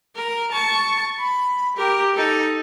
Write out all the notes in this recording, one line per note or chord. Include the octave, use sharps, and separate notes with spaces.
A#4
A5 C#6
B5
G4 A#4
D#4 A4